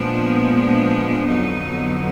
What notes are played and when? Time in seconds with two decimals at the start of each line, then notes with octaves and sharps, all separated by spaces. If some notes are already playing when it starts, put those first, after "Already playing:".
Already playing: A#2 F3 G#3 B3 D4
0.55 D4
1.27 F2 D3 F#3 B3 D#4